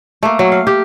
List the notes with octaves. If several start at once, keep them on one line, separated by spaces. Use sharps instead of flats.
A3 A#3
F#3
F5
G4